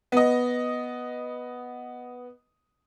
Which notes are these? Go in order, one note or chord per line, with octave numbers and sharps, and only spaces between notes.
B3 D#5